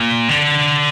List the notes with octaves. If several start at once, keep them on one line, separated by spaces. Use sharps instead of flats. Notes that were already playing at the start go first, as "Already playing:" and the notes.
Already playing: A#2
D3